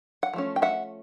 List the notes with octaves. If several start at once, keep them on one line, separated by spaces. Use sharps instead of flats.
F#5
F3 A3 C#4
G5
E5 F#5